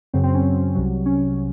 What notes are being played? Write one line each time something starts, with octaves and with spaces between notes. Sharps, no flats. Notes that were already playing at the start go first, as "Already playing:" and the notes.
F#2 C#3 F#3 C4
C4
C#4
C2 C3 F#3
C#4